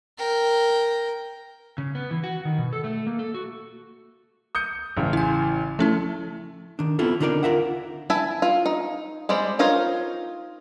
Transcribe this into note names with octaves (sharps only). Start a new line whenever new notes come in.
A#4 G5
C#3
B3
E3
F#4
D#3
B2
A4
A3
A#3
A4
F#4
D#6 G6 C#7
A1 C#3
E4 G#5
F3 A3 C#4 E4
D#3 D4
B3 C4 E4 F4 A4
D3 D4 D#4 A#4 B4 D5
F4 A#4 E5 F#5
E4 E5 G#5 A5
F4
D#4
G3 G#3 C4 D5
D#4 F4 A#4 C5 C#5